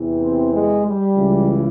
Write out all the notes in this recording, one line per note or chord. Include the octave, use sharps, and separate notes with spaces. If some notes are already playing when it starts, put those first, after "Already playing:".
Already playing: E2 C3 E3
C4
G#3
G3
C#2 C#3 E3